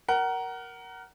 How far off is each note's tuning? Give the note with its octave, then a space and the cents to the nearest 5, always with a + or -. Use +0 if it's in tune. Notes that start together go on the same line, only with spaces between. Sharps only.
A#4 +5 F#5 +25